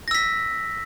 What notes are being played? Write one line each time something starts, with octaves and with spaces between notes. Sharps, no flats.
E6 A#6 B6